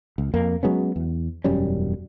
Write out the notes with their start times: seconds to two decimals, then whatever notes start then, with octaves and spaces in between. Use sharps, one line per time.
0.18 C#2
0.34 F2 A#3
0.63 F#3 G#3 B3 C#4
0.96 E2
1.44 E1 F#2 G3 C#4